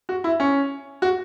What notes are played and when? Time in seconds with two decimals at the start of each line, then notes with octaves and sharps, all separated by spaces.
0.09 F#4
0.24 E4
0.40 C#4
1.02 F#4